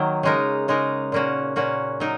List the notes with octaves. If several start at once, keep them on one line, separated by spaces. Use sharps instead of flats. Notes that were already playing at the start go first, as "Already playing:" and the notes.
Already playing: D#3 F#3 A#3
C#3 G#3 D#4 A#4
C#3 G#3 D#4 A#4
A#2 A#3 C#4 F#4
A#2 A#3 C#4 F#4
F#3 D#4 A#4